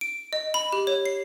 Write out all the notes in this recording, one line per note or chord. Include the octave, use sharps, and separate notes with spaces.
D7
D#5
B5
G4
C#5
C7